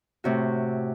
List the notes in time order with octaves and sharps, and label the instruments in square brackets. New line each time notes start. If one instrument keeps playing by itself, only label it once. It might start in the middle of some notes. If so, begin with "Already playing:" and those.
[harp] A2 C3 F#4